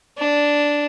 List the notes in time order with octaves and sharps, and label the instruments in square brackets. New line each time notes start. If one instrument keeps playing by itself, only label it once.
[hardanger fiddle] D4